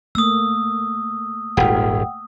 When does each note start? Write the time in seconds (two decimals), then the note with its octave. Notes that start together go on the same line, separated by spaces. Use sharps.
0.15 A3 A#3 D#6 E6
1.57 D#1 G#1 F#5 G5